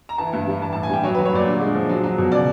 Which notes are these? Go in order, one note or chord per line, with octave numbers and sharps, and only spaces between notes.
A#5
E3 A5
G2
G3
E3 A5
A2 A5
G#5
G3 G5
F#3 C#5
B4
F#3
C#5
A#2 D5
D3
G#3
F3
F#3
F#3
B2
C#3 D5